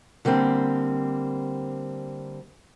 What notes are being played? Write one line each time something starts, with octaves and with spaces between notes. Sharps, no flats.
D3 G3 A#3 C4